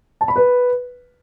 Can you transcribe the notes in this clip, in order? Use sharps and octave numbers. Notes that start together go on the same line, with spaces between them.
A5
B5
B4